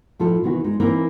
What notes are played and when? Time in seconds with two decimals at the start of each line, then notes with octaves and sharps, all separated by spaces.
0.19 A2 F3 D#4 A4
0.43 C3 D#3 E3 B3 D#4 F#4
0.64 G#3 D4 D#4
0.80 E3 A#3 C4 D#4